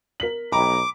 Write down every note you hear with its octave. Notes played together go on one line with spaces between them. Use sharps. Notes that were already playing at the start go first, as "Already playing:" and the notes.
A#4 B6 F#7
B1 D#5 G5 A#5 B5 D6